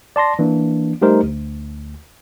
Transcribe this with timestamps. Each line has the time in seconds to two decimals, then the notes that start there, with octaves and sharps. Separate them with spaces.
0.16 D5 A5 C6 A#6
0.39 E3 A#3 D4
1.02 G3 A3 D#4 G4 A#4 C5
1.23 D2